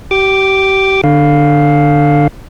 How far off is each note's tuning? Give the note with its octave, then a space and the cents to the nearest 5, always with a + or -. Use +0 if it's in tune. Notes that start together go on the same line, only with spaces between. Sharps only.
G4 -30 D6 +0
D3 +15 F5 +5